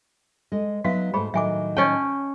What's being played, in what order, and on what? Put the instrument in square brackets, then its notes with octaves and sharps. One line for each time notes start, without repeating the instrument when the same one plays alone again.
[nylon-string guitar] G#3 A4 D#5
[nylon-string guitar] F#3 B3 D#4 [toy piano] F#4 E5 F5
[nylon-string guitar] G#2 A3 C5 [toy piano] G#4 B5
[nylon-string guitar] A2 D#3 F#3 [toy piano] E5 G#5 D6
[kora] C#4 G5 [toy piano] C#5 D#5 A5